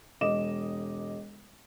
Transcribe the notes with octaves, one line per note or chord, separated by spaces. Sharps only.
E1 D#5 D6 E7